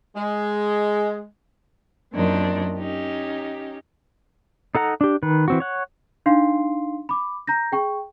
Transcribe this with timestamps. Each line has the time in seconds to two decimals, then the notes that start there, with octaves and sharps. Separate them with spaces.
0.16 G#3
2.13 F#2 A#2 C4 D4 D#4
2.75 C#4 D#4 G4
4.75 D#4 A4 F#5 A#5
5.01 D4 G4
5.23 D#3 B4
5.48 E3 C4 F#4
5.60 C#5 F#5
6.26 D4 D#4 F5 C6 C7
7.09 B5 D6
7.47 A#5 G6 A#6
7.72 G#4 G5 C#6